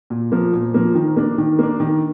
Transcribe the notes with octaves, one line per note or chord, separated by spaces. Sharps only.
A#2
F3 A#3
A#2
F3 A#3
D#3
A#3 D4
D#3
A#3 D4
D#3